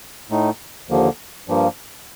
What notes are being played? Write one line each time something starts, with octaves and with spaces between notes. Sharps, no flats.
A2 A3 D#4
D#2 D3 F3 A#3
G2 F3 A#3